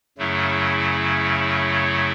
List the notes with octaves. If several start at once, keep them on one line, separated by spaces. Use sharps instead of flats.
F#2 C#3 F#3 A3 E4